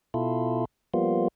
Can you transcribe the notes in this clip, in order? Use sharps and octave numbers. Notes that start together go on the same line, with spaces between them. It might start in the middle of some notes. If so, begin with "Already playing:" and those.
B2 E4 F4 A4
F3 G3 A#3 B3 F4